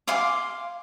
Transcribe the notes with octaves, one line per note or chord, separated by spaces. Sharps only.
F5 G#5 C6 D6